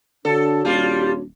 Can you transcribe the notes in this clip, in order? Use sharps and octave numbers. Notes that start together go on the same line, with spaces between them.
D3 D4 F#4 A4 C#5
D#1 G3 F4